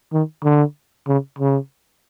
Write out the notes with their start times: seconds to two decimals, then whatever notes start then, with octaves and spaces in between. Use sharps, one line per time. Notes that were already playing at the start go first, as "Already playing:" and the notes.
0.13 D#3
0.44 D3
1.08 C#3
1.39 C#3